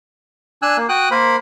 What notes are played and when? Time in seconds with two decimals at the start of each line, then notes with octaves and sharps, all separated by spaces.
0.62 D4 G#5 E6 F#6
0.77 A#3
0.89 F#4 G5 D#6 F#6
1.11 A#3 A#4 C5 B5